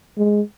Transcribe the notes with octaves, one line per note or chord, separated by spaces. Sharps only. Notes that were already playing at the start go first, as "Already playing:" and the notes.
G#3